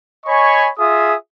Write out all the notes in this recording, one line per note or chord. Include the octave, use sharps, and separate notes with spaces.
C#5 D#5 G#5 B5 C#6
F4 G#4 E5 D#6